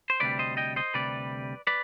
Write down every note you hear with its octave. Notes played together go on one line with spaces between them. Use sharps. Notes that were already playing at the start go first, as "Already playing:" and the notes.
C5
D2 C3 G3 B4 D5
C5 D#5
D#5 G5
C5 D#5
D2 C3 G3 B4 D5
B4 D5